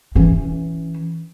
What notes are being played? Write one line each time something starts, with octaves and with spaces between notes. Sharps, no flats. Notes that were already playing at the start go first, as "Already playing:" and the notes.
E3 C#4